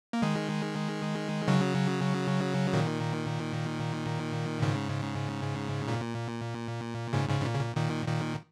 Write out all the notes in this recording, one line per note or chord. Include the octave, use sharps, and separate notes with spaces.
A#3
D#3 G#3
C#3 F#3
A#2 D#3
G#2 C#3
A#2
G#2 C#3
G#2 C#3
G#2
A#2
C#3
A#2
A#2 D#3
A#2 D#3